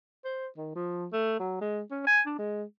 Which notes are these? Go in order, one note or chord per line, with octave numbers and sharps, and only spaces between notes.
C5
D#3
F3
A3
F#3
G#3
C#4
G#5
D4
G#3